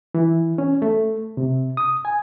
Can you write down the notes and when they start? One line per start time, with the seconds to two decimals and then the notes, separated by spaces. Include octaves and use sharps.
0.14 E3
0.58 C#4
0.82 A3
1.37 C3
1.77 D#6
2.05 G#5